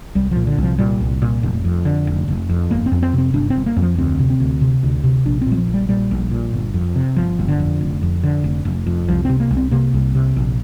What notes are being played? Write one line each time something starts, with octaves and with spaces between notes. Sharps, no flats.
C2 G3
F3
A#2
D3
C2
F3
A#2 G3
C2
A#2
F1
F2
D3
F1
F1
F2
G1 A#3
C4
F2
C4
C3 C4
G1 D4
C4
G1
A#3
F2
F3
D2 C4
C3
C4
D2
C3
D2
C3
A#1 D4
A#2 C4
G3
F3
A#1
G3
A#2 G3
A#1
A#2
G1
F2
C3
G1 F3
G1
D3
F2
F1
F2
D3
F1
F1
F2
C2 F3
C3 C4
A#3
C2
C4
C3 A#3
C2
C3
A#1